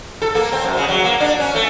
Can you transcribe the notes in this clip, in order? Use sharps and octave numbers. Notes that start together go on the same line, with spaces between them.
A4
A#3
C4
F#2
C#3
F#3
A#3
D4
C#4
A3